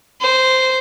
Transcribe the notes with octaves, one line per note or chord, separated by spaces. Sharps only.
C5